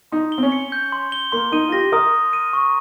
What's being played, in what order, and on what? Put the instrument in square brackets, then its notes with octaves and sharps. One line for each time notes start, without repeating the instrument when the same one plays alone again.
[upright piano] D#4 [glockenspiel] C6
[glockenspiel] G7
[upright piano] C4
C#4
[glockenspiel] C#7
G6
C6
G7
[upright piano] A#3 [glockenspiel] C6
[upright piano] D#4 [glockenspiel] D#7
[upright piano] F4
[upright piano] G4 [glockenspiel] A#6
[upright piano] A#4 [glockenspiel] D#6
[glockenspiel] C6
D#7
C#6